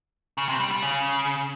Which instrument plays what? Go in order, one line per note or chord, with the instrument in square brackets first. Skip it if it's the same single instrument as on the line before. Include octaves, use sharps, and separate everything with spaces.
[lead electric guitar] C#3
C3
G3
G3
C#3